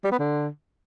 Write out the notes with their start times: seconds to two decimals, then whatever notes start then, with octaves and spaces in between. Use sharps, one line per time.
0.04 G3
0.11 B3
0.19 D3